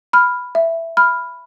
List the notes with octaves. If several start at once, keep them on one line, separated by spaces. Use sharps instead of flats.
B5 F6
E5
B5 F6